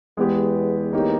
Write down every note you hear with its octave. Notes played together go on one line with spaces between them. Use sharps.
E2 G#3 B3 G4
A#3 D#4 G4 C#5